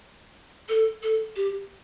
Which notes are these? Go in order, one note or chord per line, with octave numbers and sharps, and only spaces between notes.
A4
A4
G4